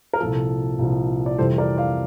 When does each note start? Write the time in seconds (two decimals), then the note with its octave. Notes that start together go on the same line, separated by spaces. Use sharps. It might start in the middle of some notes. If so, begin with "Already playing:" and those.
0.13 A#4
0.20 C2 A#2 F3 A4
0.79 C2 A#2 F3
1.26 D5
1.38 F2 C3 E3 G3 A4 C5
1.58 A#4 D5
1.77 D5 F5